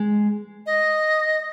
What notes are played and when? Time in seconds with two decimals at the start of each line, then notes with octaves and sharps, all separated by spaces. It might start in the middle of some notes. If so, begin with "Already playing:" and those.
Already playing: G#3
0.66 D#5